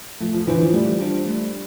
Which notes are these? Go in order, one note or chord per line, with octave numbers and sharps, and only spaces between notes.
F3 A3
F3
E3 D4 F4 C5
F3
G3 A3
D4 F4 C5
A3